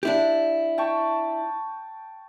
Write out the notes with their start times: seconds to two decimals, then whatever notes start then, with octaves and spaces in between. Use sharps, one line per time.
0.03 D4 E4 G4
0.78 G5 A5 C#6